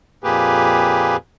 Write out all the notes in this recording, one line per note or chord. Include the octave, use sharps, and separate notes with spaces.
F2 A#2 A#3 G4 G#4 B4